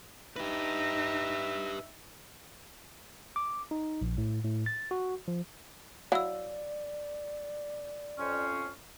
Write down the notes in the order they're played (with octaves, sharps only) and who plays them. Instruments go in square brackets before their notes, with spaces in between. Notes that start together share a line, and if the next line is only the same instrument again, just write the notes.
[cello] D#4 [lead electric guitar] G4 B4 [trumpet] E5
[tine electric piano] D6
D#4
A#1
A2
A2
A6
F#4
F3
[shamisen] F#3 E4 [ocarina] D5 [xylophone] F5 E6
[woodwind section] F2 C#4 C5